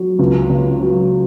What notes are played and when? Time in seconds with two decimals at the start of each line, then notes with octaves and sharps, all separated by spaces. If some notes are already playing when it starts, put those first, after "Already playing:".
Already playing: F#3
0.19 C#2
0.50 C#3
0.80 F#3